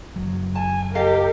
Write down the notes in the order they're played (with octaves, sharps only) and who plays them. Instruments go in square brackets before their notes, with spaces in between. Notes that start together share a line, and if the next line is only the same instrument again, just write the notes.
[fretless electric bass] F#1 F#3
[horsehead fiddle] G#5 [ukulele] A5
[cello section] G4 [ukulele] A4 D#5 F5 [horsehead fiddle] A#4